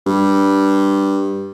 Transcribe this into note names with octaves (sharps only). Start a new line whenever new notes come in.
G2